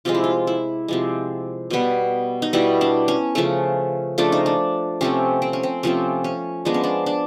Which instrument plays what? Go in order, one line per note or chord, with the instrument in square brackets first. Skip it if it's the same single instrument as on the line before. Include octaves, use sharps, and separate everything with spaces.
[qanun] C3 F3 G#3 F4
E4
F4
E4
C3 F3 G#3
B2 G3 B3
D#4
B2 G3 B3 E4
D4
C#4
C#3 F3 A3 C#4
C#3 F3 A3 D4
D#4
D4
C3 F3 A3 C4 C#4
C4
C#4
C4
C3 F3 A3 C4 C#4
C#4
F3 G#3 B3 D4
C#4
D4
D4